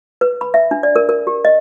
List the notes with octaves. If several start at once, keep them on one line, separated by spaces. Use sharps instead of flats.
B4
B5
E5
D4
D5
A#4
A#4
G4
D#5